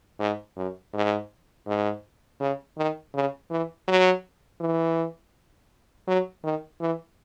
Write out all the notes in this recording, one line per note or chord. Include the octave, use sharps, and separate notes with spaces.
G#2
F#2
G#2
G#2
C#3
D#3
C#3
E3
F#3
E3
F#3
D#3
E3